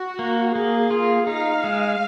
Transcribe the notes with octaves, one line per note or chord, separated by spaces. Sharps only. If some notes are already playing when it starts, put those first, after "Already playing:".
Already playing: F#4
A#3
A#3 G#4
F4
D#4 F5
G#3